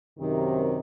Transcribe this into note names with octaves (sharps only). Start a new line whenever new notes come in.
F#2 C3 D#3